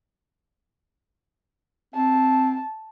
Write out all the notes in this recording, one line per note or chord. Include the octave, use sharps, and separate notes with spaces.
C4 A5